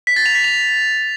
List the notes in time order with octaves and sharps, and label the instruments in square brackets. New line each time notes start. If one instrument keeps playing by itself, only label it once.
[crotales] B6
A6
F7
B6
F7